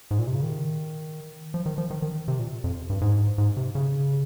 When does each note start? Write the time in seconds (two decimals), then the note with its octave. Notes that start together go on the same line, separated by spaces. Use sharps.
0.11 G#2
0.19 A#2
0.27 C3
0.35 C#3
0.43 D#3
1.54 F3
1.66 D#3
1.78 F3
1.90 D#3
2.02 D#3
2.28 C3
2.39 A#2
2.64 F2
2.90 G2
3.01 G#2
3.38 G#2
3.57 C3
3.75 C#3